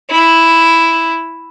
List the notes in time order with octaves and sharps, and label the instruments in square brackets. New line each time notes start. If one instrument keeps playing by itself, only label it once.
[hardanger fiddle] E4